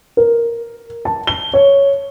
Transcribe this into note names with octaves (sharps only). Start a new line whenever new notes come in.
A#4
A5
G7
C#5